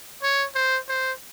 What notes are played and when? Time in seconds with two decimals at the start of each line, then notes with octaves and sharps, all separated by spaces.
0.23 C#5
0.55 C5
0.89 C5